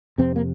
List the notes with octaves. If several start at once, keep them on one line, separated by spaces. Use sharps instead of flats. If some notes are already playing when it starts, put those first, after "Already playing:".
F2 C3 C4
A#3